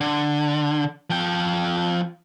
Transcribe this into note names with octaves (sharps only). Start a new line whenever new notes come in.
D3
F3 G5